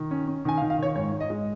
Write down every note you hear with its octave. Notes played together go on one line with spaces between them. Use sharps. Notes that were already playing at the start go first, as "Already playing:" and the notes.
Already playing: D#3
C#4
C#4
D#3 G#5
F5
D#3
F5
D#3 C#5
G#2 C#5
G#2
D#5
G#3